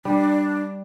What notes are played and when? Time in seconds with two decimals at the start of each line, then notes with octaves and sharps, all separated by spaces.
0.05 G3 D4